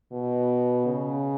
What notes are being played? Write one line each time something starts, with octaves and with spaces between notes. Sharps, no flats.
B2
C#3